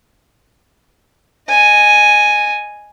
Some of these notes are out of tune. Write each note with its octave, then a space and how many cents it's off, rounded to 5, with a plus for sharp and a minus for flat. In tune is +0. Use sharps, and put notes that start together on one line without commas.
D#5 -25 G#5 +0